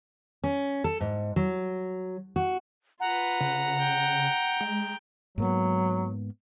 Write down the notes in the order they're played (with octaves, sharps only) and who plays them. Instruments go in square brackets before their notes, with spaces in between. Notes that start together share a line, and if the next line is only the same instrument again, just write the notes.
[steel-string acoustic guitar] C#4
A4
G#2
F#3
F#4
[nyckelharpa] F4 B4 [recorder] F#5 [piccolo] A#5
[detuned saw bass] C#3
[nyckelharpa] G5
[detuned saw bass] G#3
[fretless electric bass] G#2 A#3 B3 [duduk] F#3